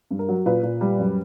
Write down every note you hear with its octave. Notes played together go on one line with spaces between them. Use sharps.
G2
A#4
F#3
A#2 B4
A#2
G3
F#2